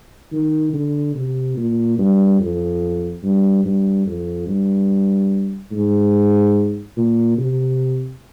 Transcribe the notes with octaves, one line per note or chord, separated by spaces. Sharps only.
D#3
D3
C3
A#2
G2
F2
G2
G2
F2
G2
G#2
A#2
C3